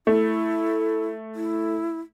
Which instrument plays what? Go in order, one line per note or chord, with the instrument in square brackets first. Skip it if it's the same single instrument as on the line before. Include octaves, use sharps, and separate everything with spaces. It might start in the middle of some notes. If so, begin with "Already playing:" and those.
[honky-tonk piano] A3 [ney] E4
[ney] E4